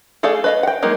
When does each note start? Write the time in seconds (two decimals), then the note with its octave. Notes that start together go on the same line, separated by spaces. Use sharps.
0.23 A3 G#4 A4 D5 F5
0.44 B4 D#5 F5
0.63 F#5 G5
0.82 F#3 G#3 A#3 D#4